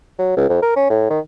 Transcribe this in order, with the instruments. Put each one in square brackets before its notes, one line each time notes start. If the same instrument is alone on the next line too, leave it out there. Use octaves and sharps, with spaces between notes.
[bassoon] F#3
C#2
F2
A#4
C#4
A2
D#3